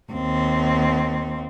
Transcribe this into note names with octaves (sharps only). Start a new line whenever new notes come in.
D#2 C4